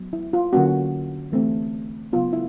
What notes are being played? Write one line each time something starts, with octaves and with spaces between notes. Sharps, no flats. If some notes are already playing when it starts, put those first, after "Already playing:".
Already playing: F#3 B3
E4
F4
D3 F#3 A#3 C#4 F#4
E3 A3 C4
C#3 F#3 B3 F4
E4